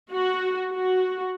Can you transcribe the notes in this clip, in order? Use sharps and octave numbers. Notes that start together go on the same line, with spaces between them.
F#4
F#4